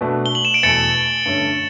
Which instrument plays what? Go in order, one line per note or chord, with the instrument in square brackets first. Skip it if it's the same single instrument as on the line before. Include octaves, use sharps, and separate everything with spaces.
[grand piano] B2 A3 D4 F#4
[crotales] G7
F#7
E7
D7
[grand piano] E2 B2 A3 [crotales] A6 C#7
[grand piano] G2 D3 A3 C#4